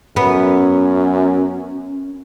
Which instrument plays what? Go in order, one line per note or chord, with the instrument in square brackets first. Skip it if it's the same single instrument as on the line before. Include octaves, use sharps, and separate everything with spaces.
[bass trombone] F#2 [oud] B3 [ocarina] C#4